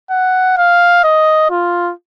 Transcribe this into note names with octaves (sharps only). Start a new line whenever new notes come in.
F#5
F5
D#5
F4